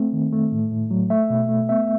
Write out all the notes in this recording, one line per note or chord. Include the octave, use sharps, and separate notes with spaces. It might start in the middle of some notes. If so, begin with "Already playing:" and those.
Already playing: A3 C4
D#3
A3
A2
A2
F#3
A3 E5
B2
A3
B3 E5